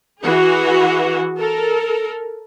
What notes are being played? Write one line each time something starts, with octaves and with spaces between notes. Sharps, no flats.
E3 F#4 G#4
A4 A#4